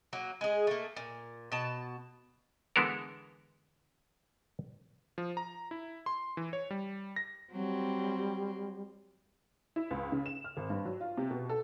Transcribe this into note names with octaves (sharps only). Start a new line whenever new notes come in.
F#3 A#3
G#3 G#4
A3 A#3
A#2
B2 A5
D3 E3 G#3 B3 A4 A#4
F3
A#5
E4
C6
E3
C#5
G3
A#6
F#3 G3 C4
E4
C#2
C#3
E7
F6
G#1
G2
F#3
F4
C3
B2
A4